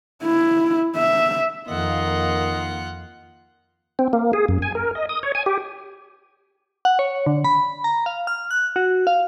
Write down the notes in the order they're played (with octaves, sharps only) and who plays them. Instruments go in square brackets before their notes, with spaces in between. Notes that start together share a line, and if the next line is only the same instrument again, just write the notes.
[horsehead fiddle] E4
E5
[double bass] F2 [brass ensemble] D#3 A#3 [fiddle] F4 F#5 [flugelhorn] D#5
[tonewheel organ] C4
A#3
G#4
F#2
G#5
A#4
D#5
D#6
C#5
G#5
G4
[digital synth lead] F#5
C#5
D3
B5
A#5
F5
F6
F#6
F#4
F5